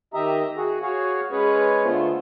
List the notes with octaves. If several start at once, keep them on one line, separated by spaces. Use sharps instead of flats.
D#3 G4 D#5 E5 A#5
F#4 G#4
F#4 G#4 C#5 F5
G#3 C#4 G#4 B4 C#5
D3 A3 B3 F4 C5